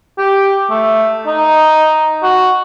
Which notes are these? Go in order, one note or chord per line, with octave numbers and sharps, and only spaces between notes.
G4
A3
D#4
F#4